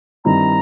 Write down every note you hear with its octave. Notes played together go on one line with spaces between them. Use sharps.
G2 D#3 G3 C4 E4 A#5